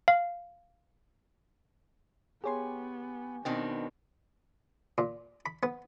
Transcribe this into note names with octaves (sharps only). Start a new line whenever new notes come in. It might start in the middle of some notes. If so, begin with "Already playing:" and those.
F5
B3 G4 G#4 C#5 G#5 C6 C#6
B2 D#3 B3 C4 D4
A#2
B5
B3